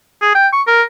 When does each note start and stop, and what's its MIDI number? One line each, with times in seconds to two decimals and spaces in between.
0.21 0.30 68
0.35 0.48 79
0.53 0.62 85
0.67 0.82 70